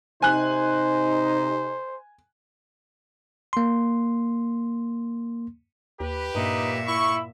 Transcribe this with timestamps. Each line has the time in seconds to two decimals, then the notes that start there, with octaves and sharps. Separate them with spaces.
0.22 C3 D#4 C5 G#5 F#6
3.53 A#3 C6
6.00 D#2 G4 B4
6.35 G2 A#2 D#4 E5
6.88 E4 C#6